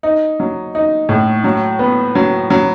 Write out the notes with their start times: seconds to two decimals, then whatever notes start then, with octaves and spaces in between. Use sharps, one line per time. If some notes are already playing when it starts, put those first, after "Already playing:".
0.03 D#4
0.40 F#3
0.75 D#4
1.09 A2
1.44 F#3
1.79 B3
2.15 F#3
2.50 F#3